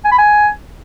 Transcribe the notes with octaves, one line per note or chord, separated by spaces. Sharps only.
G#5
B5
G#5